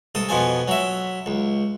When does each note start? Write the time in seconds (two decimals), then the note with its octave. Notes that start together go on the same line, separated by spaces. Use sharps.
0.15 C2 A4 D#6
0.29 F2 B2 F3 G#5
0.68 F#3 E5
1.26 C#2